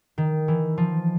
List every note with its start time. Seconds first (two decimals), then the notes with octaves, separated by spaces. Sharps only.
0.18 D#3
0.48 E3
0.78 F3